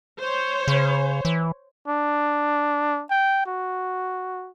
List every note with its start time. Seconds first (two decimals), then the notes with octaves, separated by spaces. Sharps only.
0.20 C5 C#5
0.68 C#3
1.25 E3
1.88 D4
3.11 G5
3.47 F#4